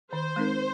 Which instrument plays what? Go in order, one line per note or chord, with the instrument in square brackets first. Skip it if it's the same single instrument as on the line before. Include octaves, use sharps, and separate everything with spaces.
[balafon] D#3 [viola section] C5
[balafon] G#3 C4 D#4 A#4